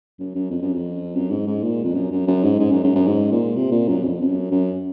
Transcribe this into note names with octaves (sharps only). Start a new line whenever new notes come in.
F#2
F#2
F2
F#2
F2
F#2
G#2
G#2
A#2
F2
F#2
F#2
F#2
G#2
G#2
F#2
F#2
F#2
G#2
A#2
C3
A#2
F#2
F2
F2
F#2
F#2